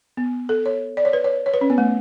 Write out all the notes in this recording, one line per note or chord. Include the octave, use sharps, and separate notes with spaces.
B3
A4
C#5
D5
C#5
B4
C#5
C#5
B4
C#4
B3
A3